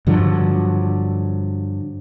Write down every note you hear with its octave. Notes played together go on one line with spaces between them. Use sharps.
G2 D3 F3 F#3